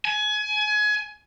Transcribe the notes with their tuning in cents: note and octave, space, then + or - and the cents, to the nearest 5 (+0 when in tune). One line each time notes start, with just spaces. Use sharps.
G#5 +25